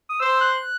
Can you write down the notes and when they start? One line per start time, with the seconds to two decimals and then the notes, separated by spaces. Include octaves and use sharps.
0.09 D#6
0.20 C5 E6
0.41 F#6